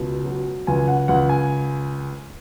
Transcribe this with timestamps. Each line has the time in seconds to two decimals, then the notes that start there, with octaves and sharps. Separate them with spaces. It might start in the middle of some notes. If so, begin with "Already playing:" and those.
Already playing: C#2 B2
0.25 F#3
0.67 C#2 G#5
0.88 F#5
1.08 C#2 F#5
1.29 G#5